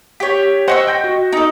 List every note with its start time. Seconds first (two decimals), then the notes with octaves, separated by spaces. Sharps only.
0.20 G4 C#5 B6
0.68 C5 D#5 F#5 G5 C#6 E6
0.87 G5 G6 A#6
1.04 F#4
1.32 D#4 A4